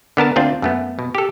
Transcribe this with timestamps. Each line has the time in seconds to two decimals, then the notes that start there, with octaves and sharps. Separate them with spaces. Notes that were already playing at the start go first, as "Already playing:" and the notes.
0.17 D3 B3 A#4 A5
0.36 D2 C4 D4 F4
0.62 F#2 A3 B3
0.99 B2
1.15 G4 A4